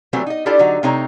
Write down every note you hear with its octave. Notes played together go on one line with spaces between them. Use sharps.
E3 F#3 G3 A3 B3 C4
D#4 D#5
D4 E4 F4 G4 A4 D5
D3 F#3 D#4 F#4
C3 A3 C4 D#4 C#5 A#5